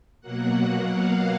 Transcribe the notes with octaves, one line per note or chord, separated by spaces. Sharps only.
B2 F#3 A#3 F#5
F5